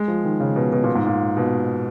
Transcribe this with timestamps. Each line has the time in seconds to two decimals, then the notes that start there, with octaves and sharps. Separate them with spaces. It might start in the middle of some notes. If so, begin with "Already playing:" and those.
Already playing: G#3
0.08 F3
0.25 D#3
0.40 C#3
0.56 B2
0.73 B2
0.84 A#2
0.95 G#2
1.06 A#2
1.37 B2